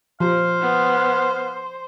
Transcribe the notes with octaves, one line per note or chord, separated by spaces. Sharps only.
F3 C5 F5
B3